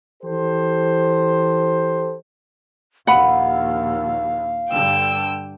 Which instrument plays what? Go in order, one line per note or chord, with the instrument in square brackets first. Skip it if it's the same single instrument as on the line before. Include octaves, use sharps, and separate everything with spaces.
[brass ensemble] E3 G4 A4 C5
[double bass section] A#1 D#2 [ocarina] F5 [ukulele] F#5 B5
[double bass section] G2 D3 [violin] G5 E6